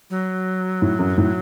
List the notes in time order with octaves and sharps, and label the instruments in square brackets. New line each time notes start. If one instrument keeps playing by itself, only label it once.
[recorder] F#3
[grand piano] A2
F#2
A2